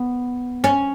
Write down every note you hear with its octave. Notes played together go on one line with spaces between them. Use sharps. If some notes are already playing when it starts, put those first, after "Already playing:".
Already playing: B3
C#4